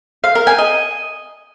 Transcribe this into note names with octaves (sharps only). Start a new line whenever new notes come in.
F5
A#4
G#5
D#5